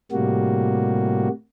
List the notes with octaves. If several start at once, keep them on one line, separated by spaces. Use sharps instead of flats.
A2 C3 G3 A#3 F#4